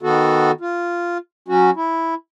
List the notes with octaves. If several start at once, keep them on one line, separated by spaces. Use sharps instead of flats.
D#3 B3 F#4 A4
F4
F#3 C#4 F#4
E4